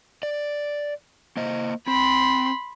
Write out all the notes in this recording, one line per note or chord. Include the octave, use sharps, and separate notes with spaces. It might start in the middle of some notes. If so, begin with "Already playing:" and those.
D5
A#3 C5 D#5
C4 B5 C6